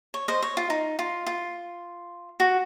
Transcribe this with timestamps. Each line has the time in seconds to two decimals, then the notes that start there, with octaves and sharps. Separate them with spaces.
0.14 C#5
0.28 C5 D#5
0.42 C#5
0.57 F4
0.70 D#4
0.99 F4
1.26 F4
2.40 F#4